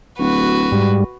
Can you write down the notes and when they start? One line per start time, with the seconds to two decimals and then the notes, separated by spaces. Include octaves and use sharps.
0.19 D1 F#4 B4
0.72 G#2 G3